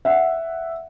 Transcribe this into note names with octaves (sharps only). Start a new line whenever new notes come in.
E5 F#5